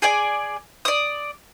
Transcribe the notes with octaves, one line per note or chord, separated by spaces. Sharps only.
G#4 D5 G#5
D5 D#6